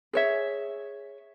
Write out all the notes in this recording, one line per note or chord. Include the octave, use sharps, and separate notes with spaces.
G#4 C#5 E5